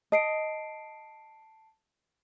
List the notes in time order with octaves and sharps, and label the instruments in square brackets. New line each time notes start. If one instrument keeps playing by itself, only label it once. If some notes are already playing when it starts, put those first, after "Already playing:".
[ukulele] D#5 [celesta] A5 C7 D7